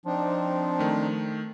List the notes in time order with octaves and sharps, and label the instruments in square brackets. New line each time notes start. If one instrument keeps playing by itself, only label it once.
[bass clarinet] F3 [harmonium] C4 D4 D#4
[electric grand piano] D#3 A3